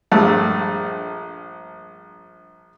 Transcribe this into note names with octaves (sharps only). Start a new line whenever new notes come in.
A#1 G2 A3